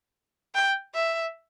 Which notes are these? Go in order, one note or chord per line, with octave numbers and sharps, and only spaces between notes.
G5
E5